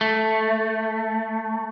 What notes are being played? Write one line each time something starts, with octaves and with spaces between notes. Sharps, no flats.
A3